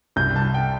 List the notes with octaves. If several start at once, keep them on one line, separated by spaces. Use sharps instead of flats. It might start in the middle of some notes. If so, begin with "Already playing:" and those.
C2 G6
A5
G5